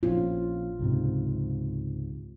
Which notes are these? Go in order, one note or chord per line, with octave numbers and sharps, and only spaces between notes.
A#1 C4 C#4 F4
C#2 G#2 C3